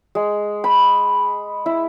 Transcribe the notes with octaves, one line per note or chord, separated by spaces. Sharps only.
G#3
B5
E4